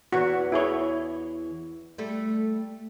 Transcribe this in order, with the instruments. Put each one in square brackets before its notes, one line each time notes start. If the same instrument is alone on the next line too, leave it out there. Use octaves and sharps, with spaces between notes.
[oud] E2 E3 [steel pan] F#4
[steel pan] E4 G#4 C#5
[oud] G3 A3